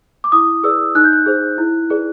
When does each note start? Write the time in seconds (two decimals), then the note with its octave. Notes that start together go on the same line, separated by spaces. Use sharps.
0.24 D6
0.32 E4 D#6
0.63 G#4 B4 D5 E6
0.95 D#4 F#6
1.04 G6
1.13 F#6
1.26 G#4 C5
1.58 E4
1.90 G#4 B4 D5